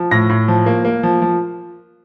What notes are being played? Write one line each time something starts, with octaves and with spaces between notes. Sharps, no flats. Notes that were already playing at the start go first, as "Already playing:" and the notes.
Already playing: F3
A2 A#6
A2
F3
A#3
A#3
F3
F3